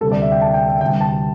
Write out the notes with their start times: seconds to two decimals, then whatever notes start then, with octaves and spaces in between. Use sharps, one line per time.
0.01 D2 C3 G3 A4
0.12 D5
0.22 E5
0.32 G5
0.42 A5
0.54 G5
0.68 E5
0.81 D2 C3 G3 G5
1.01 A5